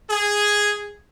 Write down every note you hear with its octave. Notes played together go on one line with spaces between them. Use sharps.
G#4